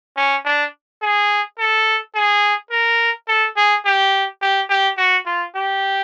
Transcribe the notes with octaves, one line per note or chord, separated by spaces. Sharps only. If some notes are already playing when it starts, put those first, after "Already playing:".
C#4
D4
G#4
A4
G#4
A#4
A4
G#4
G4
G4
G4
F#4
F4
G4